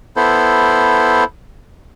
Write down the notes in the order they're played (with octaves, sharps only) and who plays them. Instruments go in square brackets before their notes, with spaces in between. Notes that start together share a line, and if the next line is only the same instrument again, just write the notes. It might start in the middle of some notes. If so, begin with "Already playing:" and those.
[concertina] B3 E4 A4 C5